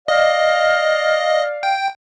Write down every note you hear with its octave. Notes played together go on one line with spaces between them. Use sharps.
D5 D#5 F5
G5